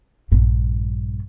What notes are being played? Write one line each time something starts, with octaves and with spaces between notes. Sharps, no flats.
A#1 G2